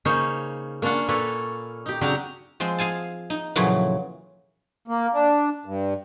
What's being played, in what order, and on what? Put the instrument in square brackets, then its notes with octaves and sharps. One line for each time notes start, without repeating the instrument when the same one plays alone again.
[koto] C#3 A#3 C#4 D#4 C5 C#5
A#3 C#4 D4 F4 F#5
A#2 A#3 F4 A4 B4 C#5
D#4 G4
C#3 F#3 C4 D4 G4 A#5
[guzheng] F3 G#3 C4
G#4 F5 G#5 A5
D#4
F2 A#2 C#3 E3 F#3
[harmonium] A#3
D4
G2